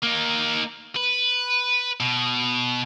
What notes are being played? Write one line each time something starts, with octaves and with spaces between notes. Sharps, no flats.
A#3 D#4
B4
B2